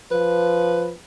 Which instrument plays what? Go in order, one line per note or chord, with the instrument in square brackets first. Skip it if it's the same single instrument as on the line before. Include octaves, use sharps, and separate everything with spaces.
[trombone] F3 [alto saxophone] B4